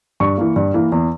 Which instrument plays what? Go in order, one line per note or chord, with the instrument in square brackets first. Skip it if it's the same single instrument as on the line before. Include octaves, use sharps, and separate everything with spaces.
[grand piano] G2 C#6
E3 A#3
G2
E3 A#3
E2